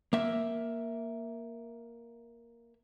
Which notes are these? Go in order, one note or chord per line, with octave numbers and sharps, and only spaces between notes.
A#3 E5